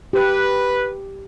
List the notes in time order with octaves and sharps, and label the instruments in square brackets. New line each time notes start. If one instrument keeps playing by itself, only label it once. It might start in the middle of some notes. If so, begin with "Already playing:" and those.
[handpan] G4 [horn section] B4